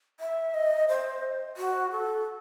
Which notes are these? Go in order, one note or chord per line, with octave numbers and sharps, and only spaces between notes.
E5
D#5
C5
F#4
A4